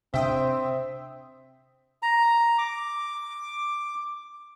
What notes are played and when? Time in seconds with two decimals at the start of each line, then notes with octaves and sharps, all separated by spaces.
0.14 C3 C4 D4 C5 E5 G5 D#6
2.02 A#5
2.58 D6